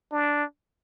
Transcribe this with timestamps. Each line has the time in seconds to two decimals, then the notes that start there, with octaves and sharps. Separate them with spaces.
0.12 D4